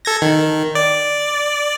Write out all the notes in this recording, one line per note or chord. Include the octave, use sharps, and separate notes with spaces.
A4 G#6 A#6
D#3
D5